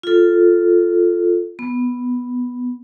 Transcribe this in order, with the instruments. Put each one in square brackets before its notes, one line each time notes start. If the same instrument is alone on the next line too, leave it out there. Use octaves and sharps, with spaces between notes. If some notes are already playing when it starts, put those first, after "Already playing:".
[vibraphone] F4 A4
B3